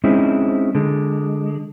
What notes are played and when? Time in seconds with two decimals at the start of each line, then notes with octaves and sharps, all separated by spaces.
0.04 G#3 C4 C#4 D#4 E4
0.75 D3 G#3